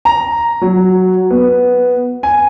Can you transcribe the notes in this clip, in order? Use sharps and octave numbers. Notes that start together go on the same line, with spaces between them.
A#5
F#3
B3
G#5